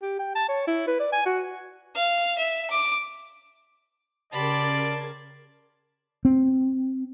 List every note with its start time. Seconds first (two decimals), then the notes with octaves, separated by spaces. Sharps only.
0.02 G4
0.19 G5
0.35 A5
0.49 C#5
0.67 E4
0.88 B4
1.00 D5
1.12 G#5
1.26 F#4
1.96 F5
2.38 E5
2.70 D6
4.32 C#3 G4 A#4 D5 A5 B5 C6 G#6
6.25 C4